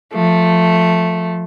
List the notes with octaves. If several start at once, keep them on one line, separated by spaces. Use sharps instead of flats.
F3 A3